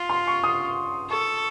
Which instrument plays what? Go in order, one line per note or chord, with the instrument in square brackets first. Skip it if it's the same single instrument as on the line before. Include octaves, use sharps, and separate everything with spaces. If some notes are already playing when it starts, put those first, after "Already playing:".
Already playing: [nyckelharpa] F4
[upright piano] C6
C#6
D#6
[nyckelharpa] A4 [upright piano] C#6